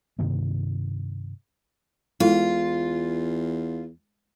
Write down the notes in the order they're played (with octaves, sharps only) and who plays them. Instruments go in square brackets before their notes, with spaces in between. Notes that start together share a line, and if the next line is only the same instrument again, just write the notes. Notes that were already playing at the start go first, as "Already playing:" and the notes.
[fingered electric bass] G2 C3 D#3 A#3
[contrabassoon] E2 [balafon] G#3 E4 A4 [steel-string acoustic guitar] F4